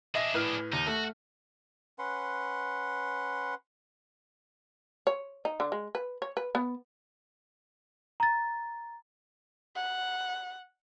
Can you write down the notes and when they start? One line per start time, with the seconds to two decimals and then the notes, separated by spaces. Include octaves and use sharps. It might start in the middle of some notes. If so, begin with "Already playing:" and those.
0.15 D4 G#4 D#5 E5 A#6
0.34 A2 B4 F6
0.73 D#2 D#4
0.87 A3 F#4
1.99 C#4 B4 F#5 C6
5.07 C#5
5.45 D#4
5.60 D3
5.72 G#3
5.95 B4
6.22 C#5
6.37 B4
6.55 B3
8.20 A#5 A6
9.76 F#5